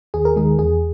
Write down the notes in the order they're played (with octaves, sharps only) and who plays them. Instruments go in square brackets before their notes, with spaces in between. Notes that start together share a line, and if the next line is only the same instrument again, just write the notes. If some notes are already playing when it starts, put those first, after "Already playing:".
[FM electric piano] D#2 G#4
A#4
D#3 G#3 G#4
E2 G#4